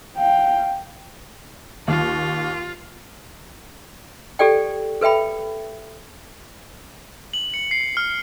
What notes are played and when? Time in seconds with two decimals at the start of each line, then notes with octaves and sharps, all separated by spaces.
0.17 F5 G5
1.88 D#2 F4
4.39 G4 A4 D5 G5
5.01 A4 B4 E5 G5 B5
7.33 F#7
7.54 C#7
7.71 C7
7.97 F6